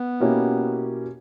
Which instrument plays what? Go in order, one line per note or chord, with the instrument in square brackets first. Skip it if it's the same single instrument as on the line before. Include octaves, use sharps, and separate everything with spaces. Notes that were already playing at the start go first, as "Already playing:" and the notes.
Already playing: [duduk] B3
[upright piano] B2 A#3 C#4 E4 G4